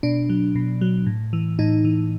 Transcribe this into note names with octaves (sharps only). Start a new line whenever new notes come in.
B2 D4
F#3
B2
F#3
A2
E3
A2 D#4
E3